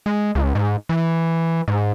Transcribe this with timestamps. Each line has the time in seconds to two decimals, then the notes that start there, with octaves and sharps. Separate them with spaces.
0.06 G#3
0.35 C#2
0.55 G#2
0.89 E3
1.68 G#2